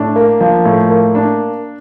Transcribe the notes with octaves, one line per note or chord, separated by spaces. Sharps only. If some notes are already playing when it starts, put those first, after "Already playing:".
Already playing: A2 D4
A#3
F3
A2
A#3
D4